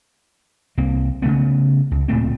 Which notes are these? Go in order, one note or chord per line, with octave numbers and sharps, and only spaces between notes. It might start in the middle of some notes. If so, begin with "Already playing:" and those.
C2 A#3 C4
C#3 E3 A3 B3
C#2
D1 A#2 A3 C4